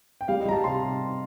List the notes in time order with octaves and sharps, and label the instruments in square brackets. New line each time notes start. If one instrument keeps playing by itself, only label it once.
[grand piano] G5
[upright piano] G3 [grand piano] F5
[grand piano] D#5
[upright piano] G3 [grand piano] A#5
[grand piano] A5
[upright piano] C3 [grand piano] C6